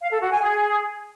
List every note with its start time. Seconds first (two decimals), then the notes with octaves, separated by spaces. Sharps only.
0.01 F5
0.11 A4
0.21 F#4
0.31 G#5
0.41 G#4